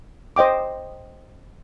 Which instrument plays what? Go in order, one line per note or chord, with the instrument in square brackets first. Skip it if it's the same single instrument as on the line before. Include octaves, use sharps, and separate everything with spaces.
[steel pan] C5 D#5 G5 D6